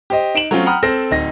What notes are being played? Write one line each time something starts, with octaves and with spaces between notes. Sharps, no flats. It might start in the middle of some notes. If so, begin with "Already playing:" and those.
G4 C5 D#5
D#4 D7 E7 F#7
F#3 A3 C4 C#4 F4
F#5 G5 A#5 B5 D#6 F6
C4 A4 C5 A#6
D1 D#4 A#6